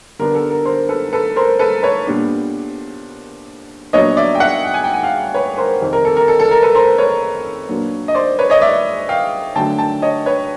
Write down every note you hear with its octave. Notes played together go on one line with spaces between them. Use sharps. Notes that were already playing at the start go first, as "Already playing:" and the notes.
D3 G3 B3 D4 A#4
A4
A#4
A#4 C5
A4 B4
A4 B4
A#4 C5
A4 B4
B4 C#5
A#2 G3 B3 D4
A#2 F#3 B3 D4 C#5 D#5
D5 E5
G5
E5 F#5
G5
G#5
G5
G#5
F5 G5
B4 C#5
A#4 C5
F2 C3 D#3
A#4
A4
A#4
A4
A4
A#4
A4 B4
A#4 C5
B4 C#5
A#2 F#3 A#3 D4
D#5
C5 D5
B4 C#5
C#5 D#5
D5 E5
F5 G5
D3 F#3 A3 D4 G5 A5
G5 A5
C#5 D#5
B4 C#5